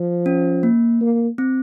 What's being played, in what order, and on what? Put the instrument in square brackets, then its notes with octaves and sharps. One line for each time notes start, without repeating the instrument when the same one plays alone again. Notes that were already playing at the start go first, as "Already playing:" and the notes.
Already playing: [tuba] F3
[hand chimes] C#4
A#3
[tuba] A#3
[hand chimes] C4